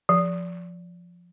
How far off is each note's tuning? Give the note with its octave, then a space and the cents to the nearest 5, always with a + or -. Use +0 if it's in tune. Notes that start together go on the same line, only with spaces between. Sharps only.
F3 +5